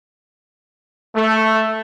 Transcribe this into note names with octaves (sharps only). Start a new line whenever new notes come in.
A3